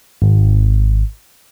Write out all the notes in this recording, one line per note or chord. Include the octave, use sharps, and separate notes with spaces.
G#1